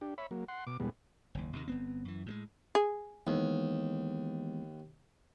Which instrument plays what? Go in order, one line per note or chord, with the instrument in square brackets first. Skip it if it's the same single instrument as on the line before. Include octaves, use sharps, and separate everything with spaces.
[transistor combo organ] D4 G4
C#5 E5 B5
F#3 A#3
F#5 C6
B2 D6
E2 B2 G3 G#3 B3
[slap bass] F#1 D#2
D#2 C3 D#3
G1 B3 C4
F#2 E3
A2 F#3 G#3
[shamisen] G#4
[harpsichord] D#2 [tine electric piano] E3 G#3 B3